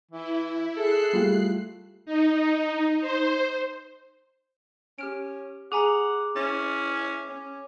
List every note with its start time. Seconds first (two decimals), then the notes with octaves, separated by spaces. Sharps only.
0.11 E3 E4
0.77 G#4 A4 F#6 C7
1.13 G3 A3 F4
2.05 D#4
3.01 C5
4.98 C#4 G4 F6 D7
5.72 G#4 F#5 G#5 A#5 D6
6.36 C#4 E4 A6
7.29 C#4